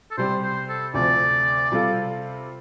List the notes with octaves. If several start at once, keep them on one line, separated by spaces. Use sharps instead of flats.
A4
C3 G3 C4 G4 C5
C5
A4
D2 C3 F3 D5
C3 G3 F4 A4